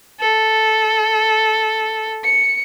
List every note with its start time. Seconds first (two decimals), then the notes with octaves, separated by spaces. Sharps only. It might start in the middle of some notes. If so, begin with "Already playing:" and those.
0.20 A4
2.24 C#7